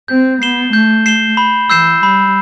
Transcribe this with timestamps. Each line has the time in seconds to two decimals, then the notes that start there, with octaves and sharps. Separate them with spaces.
0.08 C4 G6
0.41 B3 C7 E7 G7
0.73 A3 G6
1.06 C7 E7 G7
1.37 B5
1.70 E3 E6 G6 C7 E7
2.02 G3 B5